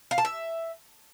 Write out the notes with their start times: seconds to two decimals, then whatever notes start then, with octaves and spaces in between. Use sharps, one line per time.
0.11 F5
0.18 A5
0.25 E5